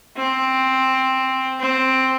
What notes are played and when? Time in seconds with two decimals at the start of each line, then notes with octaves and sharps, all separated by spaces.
0.17 C4
1.60 C4